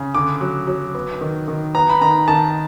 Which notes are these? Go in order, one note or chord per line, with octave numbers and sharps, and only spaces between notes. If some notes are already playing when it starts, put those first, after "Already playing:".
Already playing: C#3
D3 D6
F#3
F#3
B3
D#3
D#3
B3 A#5
B5
D#3 A#5
D#3 A5